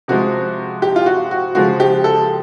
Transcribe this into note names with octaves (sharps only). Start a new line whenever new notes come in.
C3 F3 G#3 F#4
G4
F4
F#4
F#4
C#3 F3 G#3 F#4
G4
A4